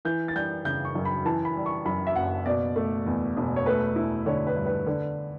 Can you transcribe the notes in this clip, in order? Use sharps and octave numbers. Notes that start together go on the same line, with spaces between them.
E3 G6
A6
G3 G6
C#3 G6
C#6
F#2
B5
E3 A5
B5
G3
C#6
F#2 B5
E5
F#1 F#5
B2 D5
A3
E2
E1
C#5
A3 B4
E4
D3 C#5
B4
G2
B4
D3